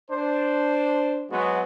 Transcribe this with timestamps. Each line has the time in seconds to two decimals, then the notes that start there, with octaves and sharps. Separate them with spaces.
0.10 D4 C5
1.31 F#3 G#3 B3 F#4